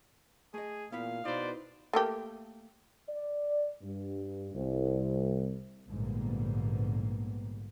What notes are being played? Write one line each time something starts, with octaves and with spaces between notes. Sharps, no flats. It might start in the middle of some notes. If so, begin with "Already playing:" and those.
A3 G#4 D#5
A#2 B3 E4 F5 B5
B2 D#4 E4 B4 C5 D5
A3 A#3 G4
D5
G2
C2
A#1 G#2 D3 G3 A#3 B3